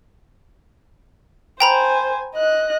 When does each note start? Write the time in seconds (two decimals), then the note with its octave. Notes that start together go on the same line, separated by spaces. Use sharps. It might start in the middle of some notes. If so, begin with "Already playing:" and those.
1.60 C5 G5 G#5 A#5 B5
2.36 D#5 F#6